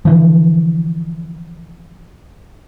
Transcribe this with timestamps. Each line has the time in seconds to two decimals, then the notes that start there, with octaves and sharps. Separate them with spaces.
0.05 D3 E3 F3